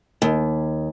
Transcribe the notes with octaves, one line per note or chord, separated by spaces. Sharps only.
D#2